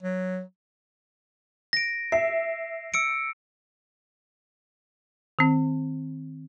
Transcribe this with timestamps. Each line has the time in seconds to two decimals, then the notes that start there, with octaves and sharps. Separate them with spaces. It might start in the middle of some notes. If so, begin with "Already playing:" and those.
0.02 F#3
1.73 A#6 D7
2.12 E5 C7
2.94 E6 C#7 D7
5.39 D#3 C4